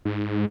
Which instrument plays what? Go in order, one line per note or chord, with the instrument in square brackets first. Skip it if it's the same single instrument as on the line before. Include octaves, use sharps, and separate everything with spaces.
[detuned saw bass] G#2